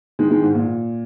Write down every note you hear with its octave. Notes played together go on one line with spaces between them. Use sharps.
D#3 G#3
D#3 G#3
G#2
A#2